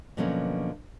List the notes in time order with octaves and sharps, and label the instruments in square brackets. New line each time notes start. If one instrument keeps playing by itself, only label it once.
[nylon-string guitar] B2 D3 F3 F#3 A#3 C#4